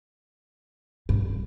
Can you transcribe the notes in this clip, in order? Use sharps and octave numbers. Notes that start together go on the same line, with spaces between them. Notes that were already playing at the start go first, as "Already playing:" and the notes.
G2